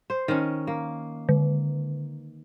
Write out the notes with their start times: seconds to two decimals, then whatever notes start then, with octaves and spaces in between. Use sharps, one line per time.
0.10 C5
0.28 D#3 C#4
0.67 A#3
1.29 D3